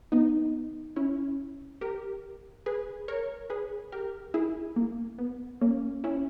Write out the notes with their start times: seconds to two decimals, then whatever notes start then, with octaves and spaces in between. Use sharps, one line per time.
0.12 B3 D#4
0.96 C#4 E4
1.81 G4 A#4
2.66 G#4 B4
3.08 A#4 C#5
3.50 G#4 B4
3.92 G4 A#4
4.34 E4 G#4
4.76 A#3
5.19 B3
5.61 A#3 C#4
6.04 C#4 E4